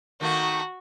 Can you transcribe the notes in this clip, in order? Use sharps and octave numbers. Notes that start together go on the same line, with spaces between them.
D#3 A3 A#3 F#4